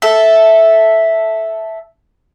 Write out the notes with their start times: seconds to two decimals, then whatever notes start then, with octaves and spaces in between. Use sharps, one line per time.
0.02 A4 E5